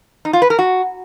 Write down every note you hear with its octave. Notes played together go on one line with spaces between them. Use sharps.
D#4
F4
B4
A#4
F#4